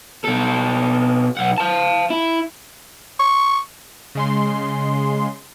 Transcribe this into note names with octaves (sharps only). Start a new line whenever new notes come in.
B2 A4
B1 F#5
F5 A5
E4
C#6
C#3 G#3 C6